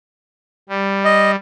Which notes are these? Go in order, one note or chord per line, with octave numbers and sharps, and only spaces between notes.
G3
D#5